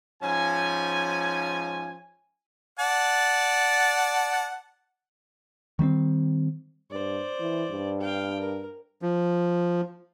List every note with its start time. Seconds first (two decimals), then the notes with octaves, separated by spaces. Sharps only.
0.23 G#2 F3 C#4 G#5
2.79 D5 F#5 A5
5.79 D#3 G3 B3 C4
6.91 G2 C5 D5
7.40 E3
7.70 G2
8.01 F5 G5
8.40 A#4
9.02 F3